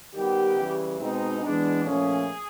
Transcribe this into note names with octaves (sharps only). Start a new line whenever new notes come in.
D#3 G3 B3 G4
C#3 E3 G3
B2 G#3 C4 D#4
E3 G#3 B3 D4
A#2 F3 A3 C#4 G#4